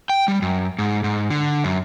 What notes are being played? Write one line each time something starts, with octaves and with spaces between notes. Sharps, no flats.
G5
G3
F#2
G#2
G#2
D3
F#2